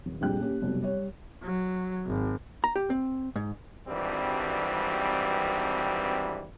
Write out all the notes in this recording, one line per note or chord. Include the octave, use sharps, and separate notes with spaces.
D#1
A#1 F2 G3 G#3 G5 F#6
A#3 C#4 G4
F1 B2 F#3 G3
G3 C#5
F#3
G#1
A#5
G4
C4
G#2
G#1 G2 E3 G3 C4 F#4